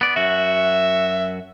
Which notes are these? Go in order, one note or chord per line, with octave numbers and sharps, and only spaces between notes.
B3 D5
F#2 F#4 E5